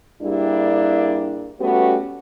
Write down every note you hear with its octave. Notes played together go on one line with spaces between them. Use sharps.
G2 G3 A#3 D4 E4 G#4
G3 A3 B3 C#4 F#4 G4